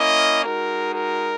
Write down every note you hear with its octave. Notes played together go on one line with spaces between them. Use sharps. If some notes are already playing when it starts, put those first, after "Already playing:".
Already playing: A#3 C#4 E4 D#5
G#3 D#4 F#4 A#4
A#4